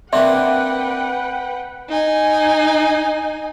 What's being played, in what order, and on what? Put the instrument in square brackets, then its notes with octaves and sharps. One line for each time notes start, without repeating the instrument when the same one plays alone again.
[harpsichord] A#3 C4 D4 [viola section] B4 F#5 G5 [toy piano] E5 C6
[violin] D#4 G#5